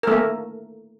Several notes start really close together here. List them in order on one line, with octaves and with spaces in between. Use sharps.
A#4 A3 A#3